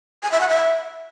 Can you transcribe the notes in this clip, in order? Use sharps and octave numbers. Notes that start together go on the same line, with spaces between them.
G#5
E5
F#5
E5